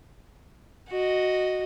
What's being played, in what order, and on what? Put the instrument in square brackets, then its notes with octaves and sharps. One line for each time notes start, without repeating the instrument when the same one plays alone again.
[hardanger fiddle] F#4 D#5